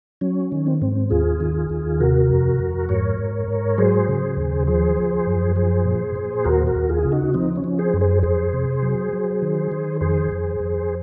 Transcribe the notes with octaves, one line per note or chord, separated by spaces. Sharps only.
F#3 C#4
D#3
C4
G#2 C4
D#2 F4 G#4
D#3
D#2
C3 F#4 A#4
F2
F2
G#2 A#4 C#5
G#2
G#2
F#3 G#4 C5
C#3
D#2
F3 G#4 C5
F3
F#2
F3 G#4 C5
A#2
A#2
D#2 F#4 A#4
F#4 A#4
D#2
F4 G#4
C#3 F4
D#4 F#4
F3 C4 D#4
C#4
F3
G#4 C5
F#2
G#4 C5
F2 G#4 C5
C3
F#3
F#3
D#3
D#3
F2 G#4 C5
F2
F2